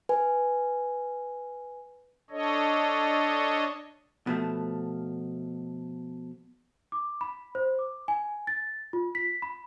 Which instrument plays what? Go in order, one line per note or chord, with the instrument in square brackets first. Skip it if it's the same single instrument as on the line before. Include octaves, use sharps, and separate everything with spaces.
[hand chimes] B4 G#5
[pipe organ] D4 A4 C#5 D#5
[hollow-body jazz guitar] B2 F3 A3
[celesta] D6
B5
C5
D6
G#5
A6
F4
B6
B5